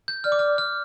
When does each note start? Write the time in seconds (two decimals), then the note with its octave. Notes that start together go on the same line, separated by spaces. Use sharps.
0.08 G6
0.24 D5 F6
0.32 D6
0.39 F6
0.58 F6